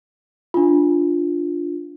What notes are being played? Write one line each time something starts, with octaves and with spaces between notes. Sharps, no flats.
D4 F4